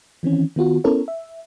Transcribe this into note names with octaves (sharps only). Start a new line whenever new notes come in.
D#3 E3 C4 C#4
D#3 B3 F4 F#4
B3 C#4 E4 A4 A#4 C#5
E5